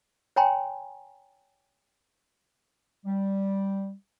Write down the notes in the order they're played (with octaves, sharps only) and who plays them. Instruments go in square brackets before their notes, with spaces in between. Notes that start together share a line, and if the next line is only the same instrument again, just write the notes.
[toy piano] C#5 G5 G#5 A#5 C6
[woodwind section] G3